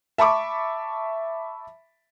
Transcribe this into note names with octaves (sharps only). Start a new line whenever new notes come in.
E5 A5 B5 C#6 D6